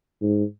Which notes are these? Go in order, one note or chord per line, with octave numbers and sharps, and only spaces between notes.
G#2